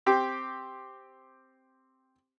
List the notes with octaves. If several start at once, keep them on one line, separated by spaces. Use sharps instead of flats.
C4 G4 G5